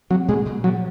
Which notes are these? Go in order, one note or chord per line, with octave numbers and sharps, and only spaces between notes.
F#3 C4
A#2 G#3
A#2
F3 F#3